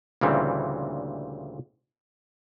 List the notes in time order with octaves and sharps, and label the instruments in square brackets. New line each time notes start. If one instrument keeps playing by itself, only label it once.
[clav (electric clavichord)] D2 A#2 C#3 E3 G3 C4